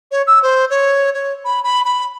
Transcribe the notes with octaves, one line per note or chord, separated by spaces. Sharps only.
C#5
E6
C5
C#5
C#5
B5
B5
B5